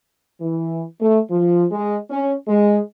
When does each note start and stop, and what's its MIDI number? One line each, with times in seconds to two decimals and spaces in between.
0.41 0.82 52
1.01 1.20 57
1.31 1.64 53
1.71 1.98 56
2.10 2.34 61
2.48 2.80 56